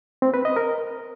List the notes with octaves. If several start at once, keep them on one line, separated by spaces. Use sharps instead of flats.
C4
B4
D#5
A#4